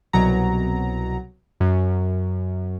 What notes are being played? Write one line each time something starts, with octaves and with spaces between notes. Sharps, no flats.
C2 B2 F#3 A#5
F#2